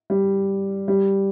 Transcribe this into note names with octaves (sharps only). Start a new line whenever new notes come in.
G3
G3